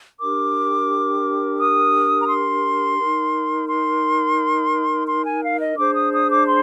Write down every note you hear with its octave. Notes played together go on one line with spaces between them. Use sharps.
D4 G4 A#4 D6
D#6
A#5
C6
D#4 A#4
C6
C6
G#5
F5
D#5
D4 G#4 C5 D6
D#6
D#6
D6
C6